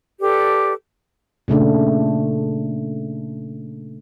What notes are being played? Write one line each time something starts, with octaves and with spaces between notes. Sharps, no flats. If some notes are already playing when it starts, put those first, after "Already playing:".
G4 A4 B4 D5
A#2 C#3 A3 D4